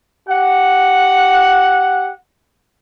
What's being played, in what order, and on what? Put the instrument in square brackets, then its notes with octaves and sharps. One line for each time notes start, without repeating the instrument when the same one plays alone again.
[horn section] G4 F#5